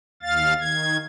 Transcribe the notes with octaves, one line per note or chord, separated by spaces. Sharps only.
D#2 F5 A6
D#3 G#6